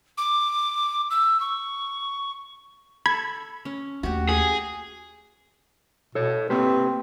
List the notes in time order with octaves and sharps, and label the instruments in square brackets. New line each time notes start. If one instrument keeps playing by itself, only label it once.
[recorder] D6
E6
C#6
[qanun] A4 [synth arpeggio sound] B5 G#6
[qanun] C#4
[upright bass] D#2 A3 [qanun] F#4 G4
[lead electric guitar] G#4
[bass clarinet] B2 [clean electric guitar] A4 C#5
[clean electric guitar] A#3 G4 B4 [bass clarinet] C4